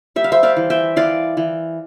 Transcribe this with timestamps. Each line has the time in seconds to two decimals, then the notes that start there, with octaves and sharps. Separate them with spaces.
0.16 G3 E5
0.24 F5
0.32 C5 E5
0.43 D5 F5
0.57 E3
0.70 E5 G5
0.96 E3 D5 F5
1.37 E3